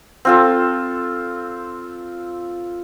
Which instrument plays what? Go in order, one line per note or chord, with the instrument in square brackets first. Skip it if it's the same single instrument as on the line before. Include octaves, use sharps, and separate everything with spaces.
[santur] C4 F4 A4